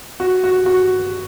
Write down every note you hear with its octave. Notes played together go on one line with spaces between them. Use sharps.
F#4
F#4
F#4